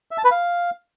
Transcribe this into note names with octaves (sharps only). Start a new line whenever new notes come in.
E5
A5
B4
F5